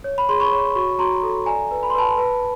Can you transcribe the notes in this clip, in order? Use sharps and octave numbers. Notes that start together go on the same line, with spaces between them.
C#5
B5
G#4 C6
B5 C#6
C#5
F#4 B5 C#6
F#4 A#5 C6
A4
D5 G#5 A#5
B4
B5
C6
B4 A5 B5
B4